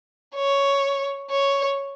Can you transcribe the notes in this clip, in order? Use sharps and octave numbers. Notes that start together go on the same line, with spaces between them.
C#5
C#5